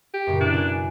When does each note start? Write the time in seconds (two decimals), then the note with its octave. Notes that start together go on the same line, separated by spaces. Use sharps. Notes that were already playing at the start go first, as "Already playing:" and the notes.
0.14 G4
0.27 F#2 A#2 C#3
0.40 B2 D4 E4 D6
0.53 F#5 G#5